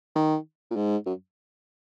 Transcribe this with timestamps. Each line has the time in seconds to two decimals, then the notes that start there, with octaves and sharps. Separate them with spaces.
0.16 D#3
0.71 A#2
0.76 G#2
1.06 F#2